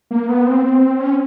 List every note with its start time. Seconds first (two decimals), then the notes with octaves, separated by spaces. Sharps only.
0.11 A#3
0.29 B3
0.47 C4
1.00 C#4